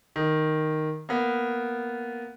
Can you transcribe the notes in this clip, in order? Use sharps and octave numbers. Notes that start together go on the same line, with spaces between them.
D#3
A#3 B3